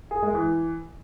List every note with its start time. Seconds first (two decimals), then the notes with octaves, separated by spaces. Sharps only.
0.11 G#4
0.23 G#3
0.35 E3